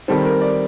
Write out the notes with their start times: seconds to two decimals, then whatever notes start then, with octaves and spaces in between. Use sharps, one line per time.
0.08 D#3 G3 C4 A4
0.25 A#4
0.41 D5